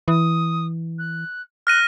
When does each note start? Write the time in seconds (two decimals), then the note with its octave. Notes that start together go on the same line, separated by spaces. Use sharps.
0.08 E3 D#6
0.98 F#6
1.67 F6 F#6 A#6 D#7